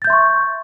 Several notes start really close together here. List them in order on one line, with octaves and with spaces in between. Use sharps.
A6 G6 E5 C6 C#6